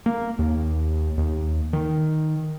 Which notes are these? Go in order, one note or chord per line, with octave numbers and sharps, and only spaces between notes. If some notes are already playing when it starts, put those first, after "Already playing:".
A#3
D#2
D#2
D#3